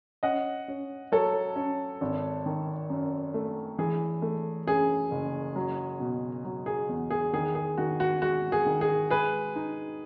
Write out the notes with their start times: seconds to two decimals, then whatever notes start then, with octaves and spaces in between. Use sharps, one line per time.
0.23 C#4 D#5 F#5
0.68 C#4
1.12 F#3 A4 C#5
1.56 C#4
2.01 G#1
2.46 D#3
2.90 F#2
3.34 A3
3.79 E3 G#4
4.22 A3
4.67 F#2 G#4
5.11 F#1
5.56 F#3
6.00 B2
6.45 F#3
6.66 G#4
6.89 E2
7.11 G#4
7.33 D#3 G#4
7.55 G#4
7.78 D#3 F#4
8.00 F#4
8.22 G#3 F#4
8.52 G#4
8.66 D#3
8.81 G#4
9.10 G#3 G#4 B4
9.56 D#4